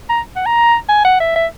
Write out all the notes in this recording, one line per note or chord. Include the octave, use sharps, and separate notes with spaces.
A#5
F#5
A#5
G#5
F#5
E5
E5